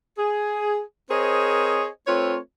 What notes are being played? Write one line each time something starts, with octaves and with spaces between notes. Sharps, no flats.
G#4
C4 G#4 A#4 C5 C#5 D#5
A3 C4 F4 B4 C#5